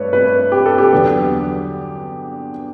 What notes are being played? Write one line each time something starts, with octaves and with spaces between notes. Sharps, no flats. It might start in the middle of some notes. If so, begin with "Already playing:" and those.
Already playing: G2 A3 B4 C#5
B4
G4
A4
G4
E2 D3 F#3 B3